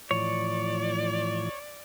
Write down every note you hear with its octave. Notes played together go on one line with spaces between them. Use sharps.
A2 E3 F3 C#5 D5